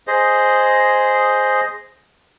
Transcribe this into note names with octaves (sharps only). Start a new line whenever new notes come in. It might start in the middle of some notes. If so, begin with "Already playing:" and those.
G#4 C5 D#5